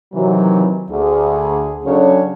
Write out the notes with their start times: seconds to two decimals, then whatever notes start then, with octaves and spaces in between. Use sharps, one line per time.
0.13 C3 D#3 E3 F#3
0.90 D2 G#4
1.85 C#3 F#3 C#4 D4 A4 C#5